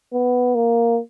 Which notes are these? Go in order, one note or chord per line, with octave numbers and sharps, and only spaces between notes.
B3
A#3